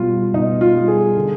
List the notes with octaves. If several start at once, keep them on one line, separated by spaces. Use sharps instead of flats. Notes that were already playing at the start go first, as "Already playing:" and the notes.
Already playing: B2 G3 F4
B2 D#4
F4
G3
G#4
D3